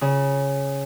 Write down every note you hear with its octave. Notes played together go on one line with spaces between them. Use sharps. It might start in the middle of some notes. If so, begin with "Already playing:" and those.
C#3